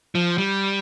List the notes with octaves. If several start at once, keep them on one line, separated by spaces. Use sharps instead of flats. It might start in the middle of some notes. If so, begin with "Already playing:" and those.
F3
G3